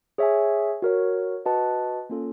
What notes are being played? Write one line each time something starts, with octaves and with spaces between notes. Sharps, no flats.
G#4 C#5 E5 G#5
F#4 A#4 C#5
F#4 B4 D#5 F#5 A5
A#3 C#4 F4 A4